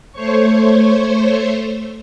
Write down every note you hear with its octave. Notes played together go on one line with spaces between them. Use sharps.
A3 C5 C#5 C#6